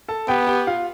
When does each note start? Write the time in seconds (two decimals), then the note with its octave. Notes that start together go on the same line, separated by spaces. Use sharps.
0.08 A4 A5
0.28 B3 G4 G5
0.47 G4 G5
0.67 F4 F5